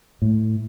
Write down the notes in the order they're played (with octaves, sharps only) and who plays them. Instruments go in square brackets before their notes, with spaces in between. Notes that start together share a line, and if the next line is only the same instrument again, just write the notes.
[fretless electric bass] A2